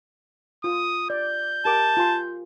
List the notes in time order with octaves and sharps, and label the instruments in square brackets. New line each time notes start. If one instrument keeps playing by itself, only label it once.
[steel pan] F4 [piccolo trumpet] D#6
[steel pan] D5 [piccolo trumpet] G6
[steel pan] G4 A#4 D6 [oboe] A5
[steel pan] F4 G#5 C6